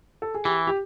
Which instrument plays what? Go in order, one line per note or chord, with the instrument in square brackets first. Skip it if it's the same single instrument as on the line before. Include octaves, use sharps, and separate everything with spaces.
[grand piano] A4
G#4
[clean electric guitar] E3 [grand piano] G4
[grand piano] G4